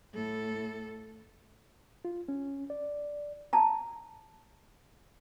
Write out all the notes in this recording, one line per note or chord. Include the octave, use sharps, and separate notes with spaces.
A2 A4
F4
C#4
D5
A5 A#5